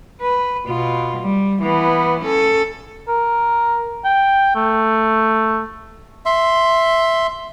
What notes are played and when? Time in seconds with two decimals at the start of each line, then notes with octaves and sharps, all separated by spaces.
0.21 B4
0.67 B2 F4
1.19 G3
1.62 E3 B3
2.21 C#4 A4
3.08 A#4
4.05 G5
4.55 A3
6.26 E5 C6